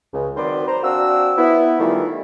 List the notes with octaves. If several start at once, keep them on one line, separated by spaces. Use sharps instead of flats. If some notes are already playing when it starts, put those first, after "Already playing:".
C#2
D#3 F#3 C4 B4 C5 D5
C5 A#5
C4 D4 F#4 F5 E6
B3 E4
D#3 E3 G3 A3 D#4 F4